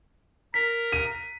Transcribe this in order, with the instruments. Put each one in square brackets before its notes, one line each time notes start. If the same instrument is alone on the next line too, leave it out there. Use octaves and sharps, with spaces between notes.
[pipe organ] A#4 [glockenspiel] B6
[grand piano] D#7